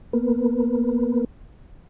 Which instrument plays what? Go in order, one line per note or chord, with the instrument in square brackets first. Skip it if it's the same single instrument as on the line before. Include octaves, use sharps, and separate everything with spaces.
[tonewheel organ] A#3 B3